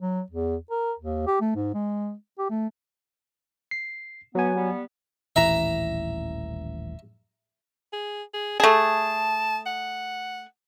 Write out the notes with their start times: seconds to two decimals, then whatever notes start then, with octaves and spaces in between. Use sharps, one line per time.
0.01 F#3
0.31 E2
0.71 A#4
0.99 D#2
1.27 G4
1.41 A3
1.55 G#2
1.74 G#3
2.39 G4
2.50 A3
3.71 C7
4.35 F#3 B3 G#5
4.55 G3 B3
5.36 D#1 A1 E3 E5 A#5
7.93 G#4
8.34 G#4
8.60 A3 G#4 A5
9.66 F#5